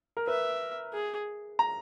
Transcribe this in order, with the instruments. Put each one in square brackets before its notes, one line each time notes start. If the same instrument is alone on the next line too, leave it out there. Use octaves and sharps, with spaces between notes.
[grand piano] A#4
[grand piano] B4 [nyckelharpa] E5
[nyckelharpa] G#4
[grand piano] A#5